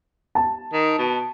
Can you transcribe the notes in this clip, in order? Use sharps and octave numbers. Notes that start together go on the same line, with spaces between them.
A5
D#3
B2